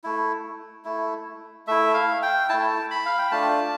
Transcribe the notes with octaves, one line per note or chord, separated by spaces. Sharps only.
A3 E4
A3 E4
A3 E4 E5
F5
G5
A3 E4 A5
B5
F5
G5
A3 D4 F4 A5